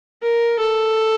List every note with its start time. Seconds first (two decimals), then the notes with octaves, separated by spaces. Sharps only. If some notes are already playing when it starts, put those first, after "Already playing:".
0.23 A#4
0.59 A4